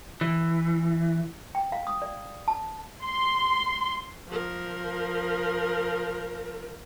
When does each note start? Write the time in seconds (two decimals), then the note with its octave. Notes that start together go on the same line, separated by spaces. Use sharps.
0.21 E3
1.55 G5
1.72 F5
1.87 D#6
2.02 D5
2.48 A5
3.04 C6
4.28 F3 A#4